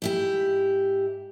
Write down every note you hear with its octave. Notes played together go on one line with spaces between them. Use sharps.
G#2 E4 G4